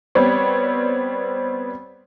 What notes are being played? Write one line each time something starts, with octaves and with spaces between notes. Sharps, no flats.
G3 B3 C4 C#5 D5